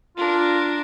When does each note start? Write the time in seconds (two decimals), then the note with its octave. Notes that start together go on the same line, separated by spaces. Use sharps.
0.17 D4 F4 A#4